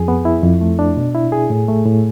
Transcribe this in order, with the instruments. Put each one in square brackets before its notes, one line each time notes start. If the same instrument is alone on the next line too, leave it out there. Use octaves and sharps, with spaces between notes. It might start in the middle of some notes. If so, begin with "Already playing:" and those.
Already playing: [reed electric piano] F2 G#4
B3
E4
F2
A3
D4
B2
E4
G#4
A2
A3
A2